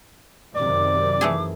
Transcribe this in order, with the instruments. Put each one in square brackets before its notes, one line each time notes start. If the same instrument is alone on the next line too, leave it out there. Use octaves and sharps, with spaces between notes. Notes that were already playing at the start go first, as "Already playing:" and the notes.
[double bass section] F#2 C3 D#3 [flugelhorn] D5 [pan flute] D6
[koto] E3 A3 G#4